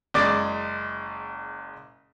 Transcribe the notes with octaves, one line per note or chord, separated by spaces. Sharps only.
F#1 G#3 D5 D6 A6